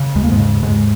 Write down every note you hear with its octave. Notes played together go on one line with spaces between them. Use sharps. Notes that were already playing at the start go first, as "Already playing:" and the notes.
Already playing: C#3
D#2 G#3
A#3
G#2 G#3
C#3
D#2 G#2 G#3